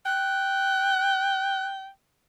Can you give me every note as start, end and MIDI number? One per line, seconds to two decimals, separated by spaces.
0.06 1.89 79
0.06 1.67 90